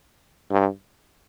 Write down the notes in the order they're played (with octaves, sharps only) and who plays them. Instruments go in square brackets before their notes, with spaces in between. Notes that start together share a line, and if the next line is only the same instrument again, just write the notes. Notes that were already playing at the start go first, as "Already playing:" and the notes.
[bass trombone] G2